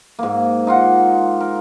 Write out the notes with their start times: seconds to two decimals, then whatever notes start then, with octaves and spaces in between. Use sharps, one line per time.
0.19 G#2 A#3
0.67 D#4 F4 F#5
1.40 A#4